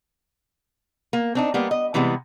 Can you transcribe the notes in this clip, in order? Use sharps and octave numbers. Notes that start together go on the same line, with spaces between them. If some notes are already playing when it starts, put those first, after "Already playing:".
A#3
C4 D4 D#4
G3 A#3 B3
D#5
C3 E3 G3 G#3 B3